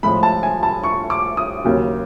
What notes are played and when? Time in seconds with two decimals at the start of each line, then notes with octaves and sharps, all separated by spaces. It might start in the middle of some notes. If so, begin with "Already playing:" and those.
0.03 A2 F3 G#3 B5
0.23 A5
0.43 G#5
0.63 A5
0.83 C#6
1.10 D6
1.37 D#6
1.64 D#2 C#3 F#3